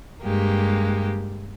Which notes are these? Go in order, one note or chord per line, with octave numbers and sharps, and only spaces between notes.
G2 G#3 A#3 G4